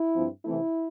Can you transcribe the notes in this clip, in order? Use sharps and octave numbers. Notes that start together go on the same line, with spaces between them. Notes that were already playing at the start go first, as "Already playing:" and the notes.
Already playing: E4
G2 F3 C4
C3 E3 A3 C4 E4